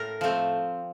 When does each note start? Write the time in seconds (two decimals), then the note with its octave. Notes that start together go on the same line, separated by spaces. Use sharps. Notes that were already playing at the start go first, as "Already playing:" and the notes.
Already playing: A2 A#4
0.21 F3 A3 C4